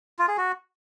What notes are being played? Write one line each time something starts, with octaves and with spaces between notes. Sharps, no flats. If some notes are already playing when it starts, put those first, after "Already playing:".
F4
G#4
F#4